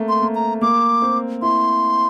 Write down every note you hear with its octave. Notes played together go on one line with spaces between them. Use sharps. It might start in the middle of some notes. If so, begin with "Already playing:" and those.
Already playing: A3 A#3 C4
C6
A#3
A#5
A#3 D6
C4
E4 C6